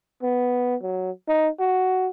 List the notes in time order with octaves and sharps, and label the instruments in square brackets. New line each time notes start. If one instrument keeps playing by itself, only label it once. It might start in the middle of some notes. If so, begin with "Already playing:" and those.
[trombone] B3
F#3
D#4
F#4